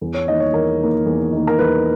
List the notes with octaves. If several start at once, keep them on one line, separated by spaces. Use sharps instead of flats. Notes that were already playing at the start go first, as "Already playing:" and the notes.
E2
C#5
D#3 A#3 D#5
C#5
E2 A#4
D#3 A#3
E2
D#3 A#3
A#4
E2 B4